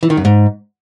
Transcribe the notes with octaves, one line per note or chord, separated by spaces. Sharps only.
E3
D#3
F#2
G#2